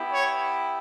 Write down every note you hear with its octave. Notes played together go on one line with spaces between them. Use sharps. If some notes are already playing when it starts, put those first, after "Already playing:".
Already playing: B3 E4 G4
C#5